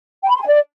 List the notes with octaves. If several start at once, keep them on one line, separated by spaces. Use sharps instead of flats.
G5
B5
C6
G#5
D5